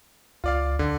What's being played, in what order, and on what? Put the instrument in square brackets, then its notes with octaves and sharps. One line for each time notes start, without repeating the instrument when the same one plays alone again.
[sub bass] C#2 [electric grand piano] F4 D5 F5
[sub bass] D2 [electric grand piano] D3